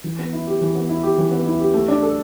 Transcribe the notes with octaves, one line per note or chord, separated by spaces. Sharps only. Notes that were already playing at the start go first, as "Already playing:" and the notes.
E3
B3
E4
G4
E3
B3
E4
G4
E3
B3
E4
G4
A3
D4
A4